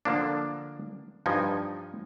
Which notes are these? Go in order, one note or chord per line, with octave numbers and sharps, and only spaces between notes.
D3 F3 A#3 D4
G2 F3 D#4 D#5 G#5